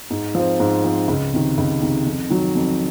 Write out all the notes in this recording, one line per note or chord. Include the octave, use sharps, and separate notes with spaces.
G#2
F3 C4
G#2
F3 C4
C#2
C3 D#3
C#2
C3 D#3
F2
D#3 F#3
F2